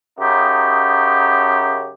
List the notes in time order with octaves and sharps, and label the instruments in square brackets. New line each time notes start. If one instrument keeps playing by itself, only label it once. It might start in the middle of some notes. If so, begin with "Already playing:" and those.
[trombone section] F#2 C#3 D#4 G4